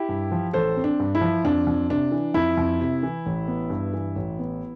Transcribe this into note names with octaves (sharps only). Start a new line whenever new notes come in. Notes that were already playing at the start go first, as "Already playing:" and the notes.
Already playing: E4 G4
G2
F3
A1 A4 C5
C4
D4
G2
E4
F3
F2 D4
F2
C3 D4
E3
F2 E4
F2
C3
E3
A1
B3
G2
E3
A1
B3